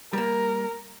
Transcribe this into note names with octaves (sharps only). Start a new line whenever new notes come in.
G3 A#3 A#4